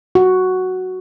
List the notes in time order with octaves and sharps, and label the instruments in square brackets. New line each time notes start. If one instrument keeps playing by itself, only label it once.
[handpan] F#4